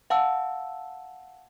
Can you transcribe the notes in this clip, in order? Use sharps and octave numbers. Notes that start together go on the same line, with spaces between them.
F5 F#5 A5 E6